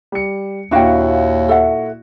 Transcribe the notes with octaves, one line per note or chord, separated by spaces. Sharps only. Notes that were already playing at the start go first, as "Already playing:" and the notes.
G3 C#7
D#2 A#2 D4 E4 F#4 F5 G5
A4 E5 F#5